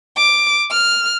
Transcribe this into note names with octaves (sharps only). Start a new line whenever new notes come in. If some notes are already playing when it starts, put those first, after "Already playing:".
D6
F6